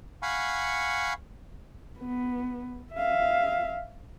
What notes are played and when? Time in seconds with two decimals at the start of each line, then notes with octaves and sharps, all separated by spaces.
0.22 F5 F#5 G#5 B5 C#6
1.99 B3
2.93 E5 F5